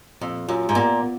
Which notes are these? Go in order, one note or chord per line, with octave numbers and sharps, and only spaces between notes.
F2 A#2
F#2 F4
G#2
A#2 B3
B3